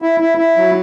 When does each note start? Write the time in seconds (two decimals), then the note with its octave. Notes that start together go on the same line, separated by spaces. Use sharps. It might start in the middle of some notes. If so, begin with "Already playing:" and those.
0.02 E4
0.20 E4
0.38 E4
0.57 F#3